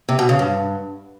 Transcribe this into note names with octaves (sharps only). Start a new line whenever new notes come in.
C3
B2
C#3
G2